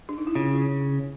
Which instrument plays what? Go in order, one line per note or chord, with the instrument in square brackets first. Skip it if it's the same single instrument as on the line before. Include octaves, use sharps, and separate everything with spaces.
[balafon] D4
D#4
E4
[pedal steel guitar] C#3 [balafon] F4
[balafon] F4